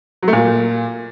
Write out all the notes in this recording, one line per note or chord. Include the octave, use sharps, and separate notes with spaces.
F#3
A3
A#2